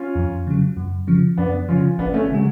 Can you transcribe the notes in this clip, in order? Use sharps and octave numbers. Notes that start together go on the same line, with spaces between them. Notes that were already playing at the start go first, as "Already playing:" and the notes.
Already playing: C#4 F4
F2
C#3 F#3
F#2
C#3 F3
F#2 B3 D4
C#3 F3 C#4 F4
G#1 B3 D4
A3 C#4
C#3 F#3 G#3